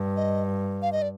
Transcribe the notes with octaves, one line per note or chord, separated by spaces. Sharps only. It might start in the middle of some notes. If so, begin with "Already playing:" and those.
Already playing: G2
D#5
F5
D#5
D5